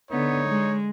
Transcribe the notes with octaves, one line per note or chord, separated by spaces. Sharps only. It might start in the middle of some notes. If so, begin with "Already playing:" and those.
D3 B3 D#4 C#5
G#3